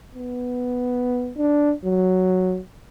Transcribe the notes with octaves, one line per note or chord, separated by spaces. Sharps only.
B3
D4
F#3